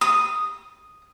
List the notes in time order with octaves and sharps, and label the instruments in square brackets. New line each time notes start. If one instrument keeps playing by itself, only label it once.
[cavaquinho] D#6